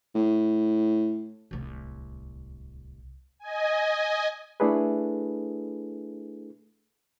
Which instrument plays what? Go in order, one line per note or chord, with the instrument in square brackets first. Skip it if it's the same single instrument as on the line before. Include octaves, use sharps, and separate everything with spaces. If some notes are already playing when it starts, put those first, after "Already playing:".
[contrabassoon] A2
[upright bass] D1 C2
[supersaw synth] D#5 G#5
[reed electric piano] A3 D4 E4 G#4 A4 B4